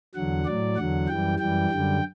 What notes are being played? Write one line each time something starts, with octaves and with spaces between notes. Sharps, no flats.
E2 D3 F#3 F#5
A2 F#3 D5
E2 D3 F#3 F#5
F#2 E3 G3 G5
F#2 E3 G3 G5
F#2 D3 G3